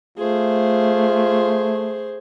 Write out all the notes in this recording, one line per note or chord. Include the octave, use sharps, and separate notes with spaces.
A3 F4 G#4 C5